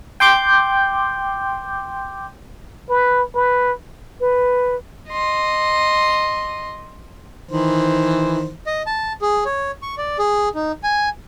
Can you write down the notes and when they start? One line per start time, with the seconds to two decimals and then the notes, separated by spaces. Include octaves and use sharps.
0.20 G5 C6 D6 G6
2.89 B4
3.35 B4
4.20 B4
5.10 D#5 C6
7.50 D#3 E3 C5
8.66 D#5
8.86 A5
9.22 G#4
9.45 C#5
9.82 C#6
9.98 D5
10.19 G#4
10.55 D#4
10.83 G#5